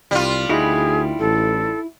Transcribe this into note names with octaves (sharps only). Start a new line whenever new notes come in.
C2 G3 F4
D2 D#4 E4 F#4 G#4
A1 A4